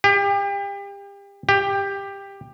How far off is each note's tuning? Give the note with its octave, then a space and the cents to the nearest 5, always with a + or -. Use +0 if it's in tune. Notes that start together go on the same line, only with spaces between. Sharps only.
G4 +35
G4 +15